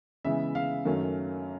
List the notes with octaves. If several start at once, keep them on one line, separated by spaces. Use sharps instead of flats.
C#3 E3 G#3 B3 E5
F5
F#2 D#3 F#3 A3 C#4